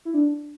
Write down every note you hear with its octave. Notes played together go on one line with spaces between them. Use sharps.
E4
D4